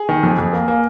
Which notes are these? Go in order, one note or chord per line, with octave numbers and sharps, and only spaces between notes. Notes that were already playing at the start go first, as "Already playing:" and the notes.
Already playing: G#4
D#3
F2
F2
A#3
A#3